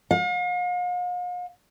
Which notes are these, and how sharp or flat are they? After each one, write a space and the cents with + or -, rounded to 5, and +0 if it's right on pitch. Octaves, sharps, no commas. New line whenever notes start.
F5 +45